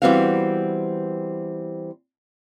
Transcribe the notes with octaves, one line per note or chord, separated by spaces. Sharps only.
E3 G3 B3 C4 F#4 F5